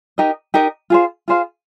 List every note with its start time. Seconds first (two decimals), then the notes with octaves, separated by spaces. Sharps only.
0.18 D#4 G4 A#4 D#5
0.54 D#4 G4 A#4 D#5
0.90 F4 G#4 C5 F5
1.28 F4 G#4 C5 F5